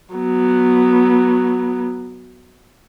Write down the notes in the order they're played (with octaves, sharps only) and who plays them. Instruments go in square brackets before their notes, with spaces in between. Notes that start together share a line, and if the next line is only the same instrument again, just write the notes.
[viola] F#3 B3